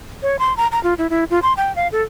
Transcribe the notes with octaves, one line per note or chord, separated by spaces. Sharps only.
C#5
C6
A#5
A#5
F4
E4
E4
F4
C6
G5
F5
A4